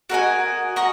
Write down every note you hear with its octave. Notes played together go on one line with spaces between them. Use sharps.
F#4 A#4 D#5 G#5
F#4 A#4 D#5